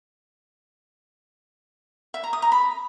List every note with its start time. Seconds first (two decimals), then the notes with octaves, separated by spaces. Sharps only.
2.14 E5
2.24 A#5
2.33 D#6
2.42 A#5
2.52 B5